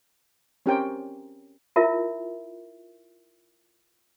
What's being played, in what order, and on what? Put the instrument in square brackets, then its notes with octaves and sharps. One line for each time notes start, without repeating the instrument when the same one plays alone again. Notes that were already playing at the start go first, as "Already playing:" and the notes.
[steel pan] C4 C#4 G4 A#4 C5 G5
[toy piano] E4 F4 A#4 E5